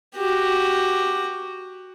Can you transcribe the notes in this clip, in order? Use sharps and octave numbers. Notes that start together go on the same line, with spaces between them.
F#4 G4